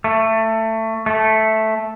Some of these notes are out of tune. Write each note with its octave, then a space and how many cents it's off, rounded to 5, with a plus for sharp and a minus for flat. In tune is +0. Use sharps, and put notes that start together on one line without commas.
A3 +20
A3 -5